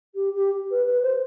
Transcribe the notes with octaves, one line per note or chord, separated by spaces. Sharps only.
G4
G4
B4
B4
C5